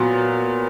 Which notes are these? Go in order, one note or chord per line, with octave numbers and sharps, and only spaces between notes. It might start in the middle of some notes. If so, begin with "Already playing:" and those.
Already playing: A#2 F#3 B3